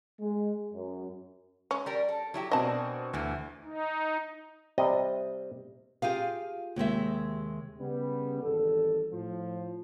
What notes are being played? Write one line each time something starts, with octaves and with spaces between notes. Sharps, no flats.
G#3
F#2
G#3 C#4
G3 A#4
A4
F#3 E4 G4
B2 C4 D4 F#4 A#4 D#5 G#5 A5
D2 B2 E3 G#5
D#4
C3 G3 D#5
F4 G4 G#4 F5
D#2 C3 G#3 E5
C#3 G3 B3
G#1 E2 G3 A4
A2 F3